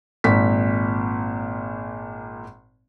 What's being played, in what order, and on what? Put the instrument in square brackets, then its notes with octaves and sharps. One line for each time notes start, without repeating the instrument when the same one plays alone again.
[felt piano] G#1 A#2 B6